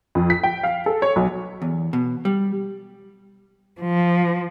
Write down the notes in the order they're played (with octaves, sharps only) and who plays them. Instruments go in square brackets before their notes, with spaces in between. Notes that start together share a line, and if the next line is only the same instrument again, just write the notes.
[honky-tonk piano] F2
B6
G5
F5
A4
C#5
B1
[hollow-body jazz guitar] E2
B2
G3
[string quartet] F3